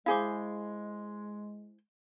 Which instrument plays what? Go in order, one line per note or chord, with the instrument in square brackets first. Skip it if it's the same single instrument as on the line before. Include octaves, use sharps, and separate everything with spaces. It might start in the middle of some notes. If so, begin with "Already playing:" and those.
[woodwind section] G#3 [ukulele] E4 G#4 C5 [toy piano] F5 G#5 D6